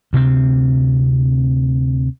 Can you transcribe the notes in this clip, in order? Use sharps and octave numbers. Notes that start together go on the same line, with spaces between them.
D2 C3 B3 C4